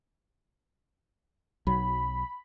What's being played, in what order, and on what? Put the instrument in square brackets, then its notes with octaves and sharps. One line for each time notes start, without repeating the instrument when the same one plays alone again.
[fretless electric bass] B1 F#3 [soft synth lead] B5